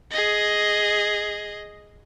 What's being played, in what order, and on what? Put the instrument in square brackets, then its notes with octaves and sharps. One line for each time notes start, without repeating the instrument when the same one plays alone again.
[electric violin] G#4 D#5